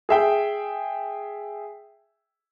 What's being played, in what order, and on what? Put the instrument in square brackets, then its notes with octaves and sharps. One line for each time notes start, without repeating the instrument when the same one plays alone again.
[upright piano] G#4 E5 G5